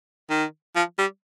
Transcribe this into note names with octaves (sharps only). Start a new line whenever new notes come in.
D#3
F3
G3